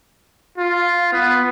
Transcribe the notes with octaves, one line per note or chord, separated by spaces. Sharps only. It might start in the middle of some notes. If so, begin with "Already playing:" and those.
F4
B3